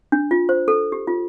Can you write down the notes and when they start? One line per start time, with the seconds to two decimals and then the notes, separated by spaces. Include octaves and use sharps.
0.12 D4
0.31 F4
0.49 C5
0.68 A4
0.92 G4
1.07 F4